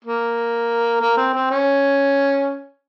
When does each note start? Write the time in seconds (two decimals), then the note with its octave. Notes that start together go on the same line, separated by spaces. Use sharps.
0.04 A#3
1.01 A#3
1.17 C4
1.34 C4
1.50 C#4